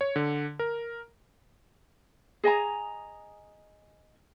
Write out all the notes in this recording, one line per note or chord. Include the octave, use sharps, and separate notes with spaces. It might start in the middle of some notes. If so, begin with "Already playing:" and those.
C#5
D3
A#4
G#4 D#5 G#5 A#5